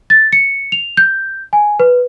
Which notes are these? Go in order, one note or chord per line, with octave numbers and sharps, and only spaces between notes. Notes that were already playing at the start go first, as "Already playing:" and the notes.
A6
C#7
F7
G6
G#5
B4